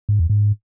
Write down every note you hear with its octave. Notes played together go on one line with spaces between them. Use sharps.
G#2
E2
G#2